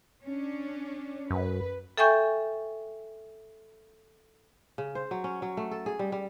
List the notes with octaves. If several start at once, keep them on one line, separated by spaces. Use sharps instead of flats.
C#4 D4
F#2 B4
A4 E5 G5 G#5 C#6 G6
C#3
C5
F#3
C#4
F#3
A3
A4
G#4
G3
G3